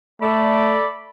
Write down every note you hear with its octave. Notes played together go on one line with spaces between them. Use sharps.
A3 A4 D5 B5